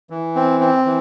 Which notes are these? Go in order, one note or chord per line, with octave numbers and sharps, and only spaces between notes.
E3
C4
C4
E3